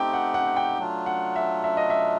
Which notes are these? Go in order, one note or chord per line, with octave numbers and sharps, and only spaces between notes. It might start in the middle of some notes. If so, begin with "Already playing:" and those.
Already playing: A3 C4 D#4 G4 G5
F#5
F#5
G5
F#3 A3 D4 F4
F#5
E5
E5
D#5
E5